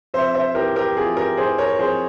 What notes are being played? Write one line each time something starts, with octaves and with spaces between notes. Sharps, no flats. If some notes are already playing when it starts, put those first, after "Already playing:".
F2 C5 E5
C5 E5
E3 G4 A#4
G4 A#4
F2 F4 G#4
G4 A#4
E3 G#4 C5
A#4 C#5
F2 G#4 C5